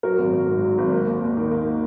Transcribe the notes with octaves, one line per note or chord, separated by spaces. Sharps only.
F#3 F#4 A#4
G#1
G#1
G#2
F#3
G#1
A#3
D#2
D#2
D#3
A#3